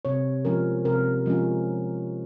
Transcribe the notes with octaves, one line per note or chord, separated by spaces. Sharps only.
C3 C#5
F3 G#3 C#4 A#4
C3 A#4
F3 G#3 C#4